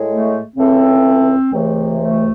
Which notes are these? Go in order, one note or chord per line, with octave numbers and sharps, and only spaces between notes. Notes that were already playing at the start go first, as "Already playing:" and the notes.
Already playing: A2 G#3
A3
C#2 C#3 E3 A3 C4
C#2 C3 E3 A3
A3